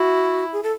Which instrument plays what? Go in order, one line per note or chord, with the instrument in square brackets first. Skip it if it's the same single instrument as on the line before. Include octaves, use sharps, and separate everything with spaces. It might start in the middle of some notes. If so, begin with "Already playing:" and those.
Already playing: [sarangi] E4 [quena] F#4
[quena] G#4
A4